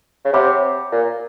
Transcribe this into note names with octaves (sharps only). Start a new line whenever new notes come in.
C#3
C3 C#5 F#5 B5 D6
A#2